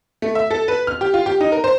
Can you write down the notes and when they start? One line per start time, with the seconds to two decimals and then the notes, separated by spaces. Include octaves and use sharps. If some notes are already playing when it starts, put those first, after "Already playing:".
0.22 A3
0.35 E5
0.51 A4
0.68 B4
0.87 F6
1.01 G4
1.14 F4
1.26 G4
1.41 D#4
1.52 A#4
1.64 C5